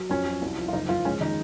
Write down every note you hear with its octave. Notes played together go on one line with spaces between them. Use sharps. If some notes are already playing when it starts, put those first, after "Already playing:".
Already playing: F#3
F2 C#4
F#3
C2
F3
F4
F#1 D#4
F2 F4
G#3 C#4
D#3 D#4